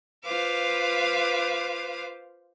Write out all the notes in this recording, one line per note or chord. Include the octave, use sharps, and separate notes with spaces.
F4 B4 C5 F5 D6